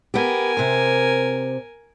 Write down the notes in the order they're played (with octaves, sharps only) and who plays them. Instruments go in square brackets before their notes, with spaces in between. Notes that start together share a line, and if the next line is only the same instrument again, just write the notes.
[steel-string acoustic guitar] B3 G4 [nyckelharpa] A#4 G#5
[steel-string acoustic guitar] C3 C5